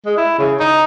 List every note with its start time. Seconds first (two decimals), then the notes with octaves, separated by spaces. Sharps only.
0.06 G#3
0.17 E4
0.39 C#3
0.60 D#4